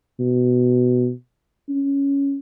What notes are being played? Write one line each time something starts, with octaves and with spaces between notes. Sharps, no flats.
B2
C#4